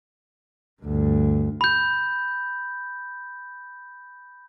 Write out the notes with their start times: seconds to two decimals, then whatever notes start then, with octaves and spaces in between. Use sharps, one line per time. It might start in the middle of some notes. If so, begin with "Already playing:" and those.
0.83 D2 G2
1.61 B5 G6